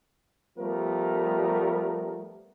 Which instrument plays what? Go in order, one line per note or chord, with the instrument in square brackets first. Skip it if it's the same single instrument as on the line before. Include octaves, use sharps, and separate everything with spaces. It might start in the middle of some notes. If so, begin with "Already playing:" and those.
[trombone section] F3 G3 A3 B3 A#4